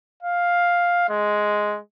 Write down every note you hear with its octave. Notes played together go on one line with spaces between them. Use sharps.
F5
G#3